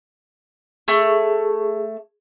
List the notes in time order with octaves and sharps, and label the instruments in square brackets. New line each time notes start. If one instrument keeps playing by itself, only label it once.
[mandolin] A3 C#6 [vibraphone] G#4